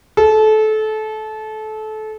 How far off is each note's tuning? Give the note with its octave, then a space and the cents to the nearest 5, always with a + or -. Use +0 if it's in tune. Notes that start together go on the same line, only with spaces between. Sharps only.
A4 -25